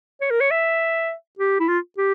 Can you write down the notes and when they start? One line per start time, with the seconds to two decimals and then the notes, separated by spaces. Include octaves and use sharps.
0.21 C#5
0.31 A#4
0.41 C#5
0.50 E5
1.39 G4
1.60 E4
1.68 F4
1.98 G4